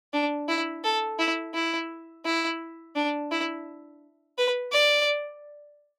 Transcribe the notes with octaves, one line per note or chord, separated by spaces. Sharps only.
D4
E4
A4
E4
E4
E4
D4
E4
B4
D5